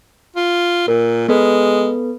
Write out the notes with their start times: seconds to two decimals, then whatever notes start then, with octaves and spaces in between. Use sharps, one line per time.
0.36 F4
0.88 A#2 A#4
1.28 G#3 B3 A4 B4